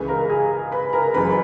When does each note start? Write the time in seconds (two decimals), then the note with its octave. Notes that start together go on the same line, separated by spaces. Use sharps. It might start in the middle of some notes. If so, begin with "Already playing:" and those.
Already playing: C#2 C#3 E3 B4 B5
0.08 A#4 A#5
0.30 G#4 G#5
0.72 B4 B5
0.93 A#4 A#5
1.14 F#1 F#2 C#3 E3 B4 B5